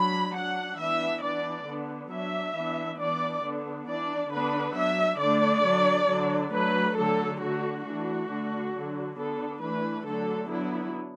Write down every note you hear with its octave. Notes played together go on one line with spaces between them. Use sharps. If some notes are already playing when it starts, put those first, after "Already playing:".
Already playing: F#3 D4 B5
F#3 D4 F#5
E3 B3 D4 E5
E3 B3 D4 D5
D3 B3 D4
F#3 D4 E5
E3 B3 D4
E3 B3 D4 D5
D3 B3 D4
E3 D4 D5
D3 B3 D4 B4
F#3 D4 E5
D3 A3 D4 D5
D3 F#3 D4
D3 F#3 D4
F#3 A3 D4 B4
D3 F#3 A3 D4 A4
D3 A3 D4 F#4
E3 A3 D4 F#4
D3 A3 D4
D3 F#3 D4
D3 B3 D4 A4
E3 A3 D4 B4
D3 F#3 A3 D4 A4
F#3 B3 D4 E4